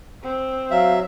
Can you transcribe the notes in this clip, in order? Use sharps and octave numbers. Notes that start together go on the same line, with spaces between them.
C4
F#3 E5 F5